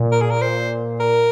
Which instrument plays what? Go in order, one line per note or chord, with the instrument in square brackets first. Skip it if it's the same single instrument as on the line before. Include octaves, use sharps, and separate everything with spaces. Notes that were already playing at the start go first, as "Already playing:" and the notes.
Already playing: [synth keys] A#2
[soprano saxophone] A#4
G#4
A#4
C5
A#4